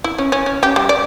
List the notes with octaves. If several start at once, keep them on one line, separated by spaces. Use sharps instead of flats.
E4
C#4
C#4
C#4
G4
G3
D5